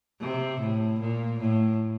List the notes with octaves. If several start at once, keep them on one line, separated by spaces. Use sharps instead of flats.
C3
A2
A#2
A2